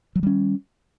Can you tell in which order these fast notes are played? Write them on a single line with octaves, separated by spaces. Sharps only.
F#3 D#3 G3 C#4